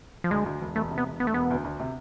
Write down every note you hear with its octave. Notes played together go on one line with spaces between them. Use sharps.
F3
D2 G#3
D2
E1
E1 A3
C3
B3
E1
E1 B3
A3
E1 B3
D2
D2
C3